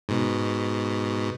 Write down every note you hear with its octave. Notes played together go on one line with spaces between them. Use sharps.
G#2 B2